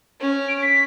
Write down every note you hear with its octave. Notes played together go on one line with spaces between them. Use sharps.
C#4
D7
B6